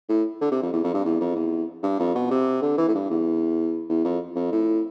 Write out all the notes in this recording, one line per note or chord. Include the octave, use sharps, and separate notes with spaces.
A2
D3
C3
F2
E2
F2
G2
E2
F2
E2
G2
F2
B2
C3
D3
E3
A2
G2
E2
E2
F2
F2
A2